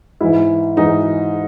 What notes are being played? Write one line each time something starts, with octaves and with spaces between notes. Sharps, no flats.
G#2 E3 E4
G#2 E3 D#4